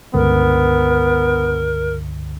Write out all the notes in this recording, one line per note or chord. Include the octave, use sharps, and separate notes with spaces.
C#2 G2 D3 B3 A#4